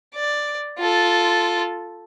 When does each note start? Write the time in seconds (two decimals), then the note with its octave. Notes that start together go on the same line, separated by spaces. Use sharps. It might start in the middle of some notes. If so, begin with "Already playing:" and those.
0.15 D5
0.79 F4 A4